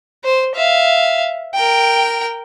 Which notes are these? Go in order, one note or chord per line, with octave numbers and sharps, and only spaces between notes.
C5
E5 F5
A#4 G5